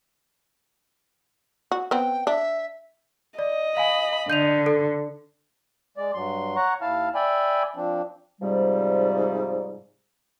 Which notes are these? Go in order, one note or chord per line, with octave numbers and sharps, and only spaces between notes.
F#4
B3 C4 G5
D4 E5
D5 D#5
F5 G#5 B5
D3 G6 D#7 F7
A4
G#3 D5
G2 F#3 C6
C#5 F#5 A#5 C#6
D#2 E4 F5 A5 F6
D5 E5 G5 G#5 B5
F3 C4 D4
G#2 C3 F3 G3